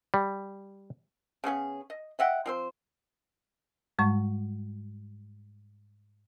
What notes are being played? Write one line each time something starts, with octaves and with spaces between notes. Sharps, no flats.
G3
C#3 B3 C#4 G#4
D#5
D#5 E5 F#5 G5
F3 C4 C5
G#2 G3 G#3 C#6